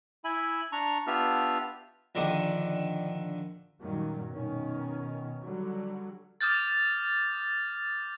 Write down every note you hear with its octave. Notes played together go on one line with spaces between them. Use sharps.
E4 E5 G#5 B5
D4 A#5 C#6
B3 D4 F4 G4 E5 F6
A#1 D3 D#3 D6 D#6
F#2 A#2 D#3 F#3 G3
B2 D#3 C#4
D3 F#3 G3
D6 D#6 F6 G6 A6